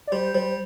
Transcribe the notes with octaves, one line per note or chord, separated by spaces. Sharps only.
D5
G3 C5
G3 C5